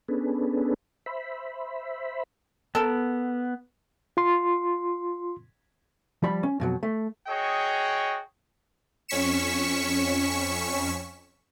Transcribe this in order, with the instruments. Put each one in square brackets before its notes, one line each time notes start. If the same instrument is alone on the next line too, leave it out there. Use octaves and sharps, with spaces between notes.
[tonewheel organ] B3 C#4 D4 G#4 A4 B4
C5 E5 B5
[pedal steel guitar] B3 [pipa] A4 A#4
[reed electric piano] F4 C6
[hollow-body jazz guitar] F3 G3 B5
C#4
F2 B2 F#3
A3
[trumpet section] F#4 G#4 C#5 D#5 G5
[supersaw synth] F2 C#4 C#6 B6 C#7 E7